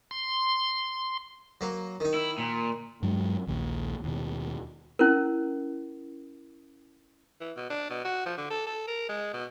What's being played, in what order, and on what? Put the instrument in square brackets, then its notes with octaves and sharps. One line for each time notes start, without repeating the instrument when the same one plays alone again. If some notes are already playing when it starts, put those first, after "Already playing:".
[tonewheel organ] C6
[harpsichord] F#3 A#3
D#3 D#4
[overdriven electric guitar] E4
A#2
[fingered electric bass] G2 F#3 G#3
A#1 D#2
D#2 B2
[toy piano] C#4 E4 A#4
[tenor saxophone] E3
B2
D4
B2
F#4
F3
D3
A4
A4
A#4
G#3
B2